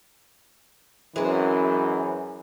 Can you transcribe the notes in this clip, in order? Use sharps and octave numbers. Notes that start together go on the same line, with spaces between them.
F#2 E3 G#3 C4